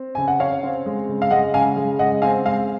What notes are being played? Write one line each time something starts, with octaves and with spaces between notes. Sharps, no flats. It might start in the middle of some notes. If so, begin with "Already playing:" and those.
Already playing: C4
C#3 G#5
F#5
C#3 C#5 F5
C4
G#3
C#3
F5
G#3 D#5 F#5
C#3 F5 G#5
G#3
C#3 D#5 F#5
C4 F5 G#5
G#3 F5 G#5